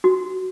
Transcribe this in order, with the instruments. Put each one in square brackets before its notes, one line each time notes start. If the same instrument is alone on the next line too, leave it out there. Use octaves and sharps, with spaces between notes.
[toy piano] F#4